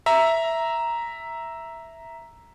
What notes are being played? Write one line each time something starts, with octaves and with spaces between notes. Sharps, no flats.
E5 A#5